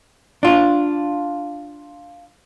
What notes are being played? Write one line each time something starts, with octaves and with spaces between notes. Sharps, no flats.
D4 F4